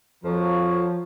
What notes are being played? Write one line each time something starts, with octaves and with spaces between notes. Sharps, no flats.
F2 F3 F#4 A#4 C#5